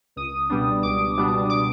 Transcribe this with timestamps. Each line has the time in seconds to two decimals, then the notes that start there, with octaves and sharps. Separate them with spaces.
0.16 C#2 D#6
0.49 B2 G3 B3 D4
0.83 C#2 D6
1.17 B2 G3 B3 D4
1.50 D6